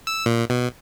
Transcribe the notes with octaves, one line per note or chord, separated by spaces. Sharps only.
E6
A#2
B2